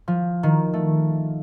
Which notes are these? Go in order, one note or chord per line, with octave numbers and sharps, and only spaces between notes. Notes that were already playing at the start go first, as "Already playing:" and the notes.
F3
D#3
A3